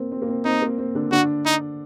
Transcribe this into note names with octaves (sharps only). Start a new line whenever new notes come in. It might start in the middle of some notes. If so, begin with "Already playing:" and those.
Already playing: A#3 C4
C4
A#3
C4
C4 D#4
A#3
C4
D3 D4
D3 D4 F#4
D#4